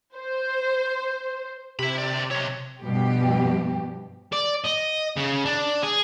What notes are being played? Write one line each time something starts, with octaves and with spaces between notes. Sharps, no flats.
C5
C3 E5 B5
D2 D5
D#4 C#5
G2 B2 F3 G4
D5
D#5
C#3
D4
G#4